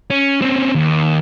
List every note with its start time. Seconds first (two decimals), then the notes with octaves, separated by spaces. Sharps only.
0.10 C#4
0.42 C4 C#4
0.75 D#2